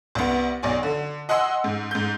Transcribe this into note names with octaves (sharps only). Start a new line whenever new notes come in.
C2 B3
B1 D5 G#5
D3
D#5 F#5 G#5 C6 E6
G#2
G#2 G6